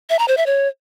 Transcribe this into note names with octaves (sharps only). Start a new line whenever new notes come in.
E5
A#5
C5
E5
C#5